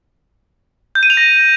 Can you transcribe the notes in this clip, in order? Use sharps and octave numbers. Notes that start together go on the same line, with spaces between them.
G6
D#7
F7
A#6